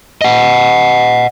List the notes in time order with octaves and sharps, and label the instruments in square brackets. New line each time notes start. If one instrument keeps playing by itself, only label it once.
[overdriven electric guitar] D#5 F#5